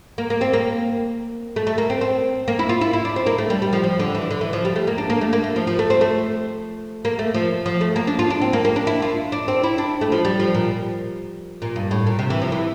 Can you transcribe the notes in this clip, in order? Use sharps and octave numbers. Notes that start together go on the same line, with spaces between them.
A#3
A#3
C4
A#3
A3
A3
A#3
C4
C4
A#3
E4
F4
E4
E4
D4
C4
A#3
A3
G3
G3
F3
F3
D3
E3
D3
E3
F3
G3
A3
A#3
D4
A#3
A3
A#3
A3
F3
F3
A3
C4
A3
A#3
A3
F3
F3
A3
A#3
D4
F4
D4
C4
A#3
A#3
D4
E4
F4
D4
C4
E4
D4
A3
F3
G3
F3
A#2
A#2
G2
A2
A#2
C3
E3
F3
E3